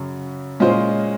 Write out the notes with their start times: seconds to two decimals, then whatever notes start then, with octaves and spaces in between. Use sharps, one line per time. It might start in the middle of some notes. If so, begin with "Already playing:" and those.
Already playing: F#2 C#3 F#3
0.60 A#2 G#3 C#4 F4 C5